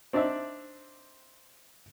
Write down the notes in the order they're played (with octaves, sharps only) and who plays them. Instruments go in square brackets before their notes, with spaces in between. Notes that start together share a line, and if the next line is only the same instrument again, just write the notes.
[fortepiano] C4 D4 D#4 D5 E5